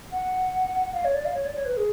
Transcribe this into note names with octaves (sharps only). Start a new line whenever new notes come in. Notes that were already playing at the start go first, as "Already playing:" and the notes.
F#5
F5
C#5
D5
F5
C#5
D5
C#5
B4
G#4